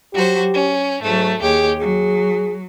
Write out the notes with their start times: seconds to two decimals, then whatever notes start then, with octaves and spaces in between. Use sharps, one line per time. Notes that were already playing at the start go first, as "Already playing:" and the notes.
0.14 F#3 F#4 G4 C5
0.53 C#4
1.03 G#2 F#3 A3
1.41 D#2 G4 G#4 C#5
1.79 F#3 G#4